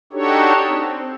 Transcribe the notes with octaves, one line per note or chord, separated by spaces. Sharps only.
D4 D#4 F#4 G4 A4 C#5
C4